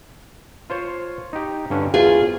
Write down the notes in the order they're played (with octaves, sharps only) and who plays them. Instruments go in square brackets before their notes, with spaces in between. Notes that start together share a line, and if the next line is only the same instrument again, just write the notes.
[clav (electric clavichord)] F4 C5 C#5
D#4 G4
G2 D3 C#4
[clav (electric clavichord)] E2 C5 F5 [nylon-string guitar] F4 G#4